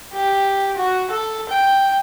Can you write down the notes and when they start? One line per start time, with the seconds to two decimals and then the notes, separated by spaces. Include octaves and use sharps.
0.13 G4
0.77 F#4
1.11 A4
1.49 G5